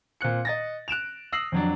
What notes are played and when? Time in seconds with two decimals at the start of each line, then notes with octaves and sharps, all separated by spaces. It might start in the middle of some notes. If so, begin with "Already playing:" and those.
0.21 A#2 C4 F#6 C#7
0.45 D#5 A6 A#6
0.88 F#6 D7 E7 F7
1.32 D#6 E6 A#6 C7 F#7
1.52 F2 F#3 D4